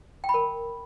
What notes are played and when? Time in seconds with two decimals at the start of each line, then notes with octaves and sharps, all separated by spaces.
0.24 G5
0.29 B5
0.34 A#4